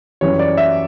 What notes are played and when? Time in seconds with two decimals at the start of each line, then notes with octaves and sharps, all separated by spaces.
0.21 F#2 E3 G3 C#5
0.39 D5
0.57 E5